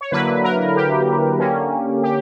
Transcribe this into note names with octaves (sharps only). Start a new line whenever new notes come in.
C#5
D3 F#3 A#3 E4 B4
A#4
G4
D3 A#3 C#4
G4